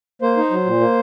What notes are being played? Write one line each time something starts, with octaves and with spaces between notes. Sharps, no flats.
A#3 C5
D#4
F#3
A#2
A#3